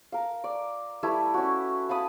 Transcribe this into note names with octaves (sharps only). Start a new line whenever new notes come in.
A#4 F5
D5
G3 A3 E4 B4
C#4 F#4
F5 A5 B5 D#6